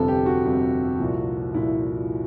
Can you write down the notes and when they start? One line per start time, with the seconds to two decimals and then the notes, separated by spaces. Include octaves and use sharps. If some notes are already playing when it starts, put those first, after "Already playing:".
Already playing: G1 F2 C3 A4
0.08 G4
0.26 F#4
0.44 G1 F2 C3
0.99 C2 A#2 F3
1.54 C2 A#2 F3 E4